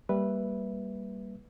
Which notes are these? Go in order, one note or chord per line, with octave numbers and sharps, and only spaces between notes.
G3 A#3 B4 E5